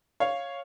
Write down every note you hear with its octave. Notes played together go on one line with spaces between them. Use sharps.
C#5 F5